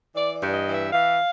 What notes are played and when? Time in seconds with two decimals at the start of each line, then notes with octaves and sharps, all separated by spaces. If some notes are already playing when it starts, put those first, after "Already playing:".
0.14 E3 D5
0.35 D5
0.41 G2
0.54 D#5
0.67 E3
0.74 E5
0.93 E3 F5